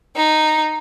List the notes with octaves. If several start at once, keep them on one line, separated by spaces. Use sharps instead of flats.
D#4